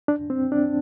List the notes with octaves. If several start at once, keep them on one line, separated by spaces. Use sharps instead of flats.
D4
C4
D4